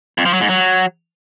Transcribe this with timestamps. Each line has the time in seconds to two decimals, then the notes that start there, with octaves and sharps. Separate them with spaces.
0.18 F2
0.26 F3
0.33 F#3
0.41 G#2
0.49 F#3